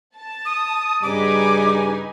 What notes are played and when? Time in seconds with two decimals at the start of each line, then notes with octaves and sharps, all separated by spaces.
0.16 A5
0.45 D#6
1.03 G2 C#3 G3 D#4 B4 G#5 D6